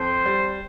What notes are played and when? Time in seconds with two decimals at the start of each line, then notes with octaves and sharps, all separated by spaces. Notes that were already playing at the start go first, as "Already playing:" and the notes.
Already playing: F2 C5
0.26 G3